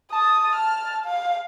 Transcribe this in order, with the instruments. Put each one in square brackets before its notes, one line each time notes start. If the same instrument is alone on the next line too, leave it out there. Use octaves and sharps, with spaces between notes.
[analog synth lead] A5 [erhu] D#6
[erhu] F6
F5